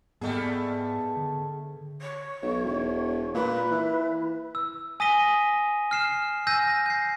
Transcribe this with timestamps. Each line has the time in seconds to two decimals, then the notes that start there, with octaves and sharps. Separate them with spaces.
0.21 G#2 G3 A3 B3 G#4 D#5 G5
1.17 D3
2.01 C#5
2.42 B1
2.64 E1
3.34 A#2 B4
3.71 E3
4.55 E6
5.00 G#5 D#6 A#6 B6 D#7 G7
5.91 F6 C7 E7
6.47 G#5 E6 G6 A#6 D#7
6.86 G6 C7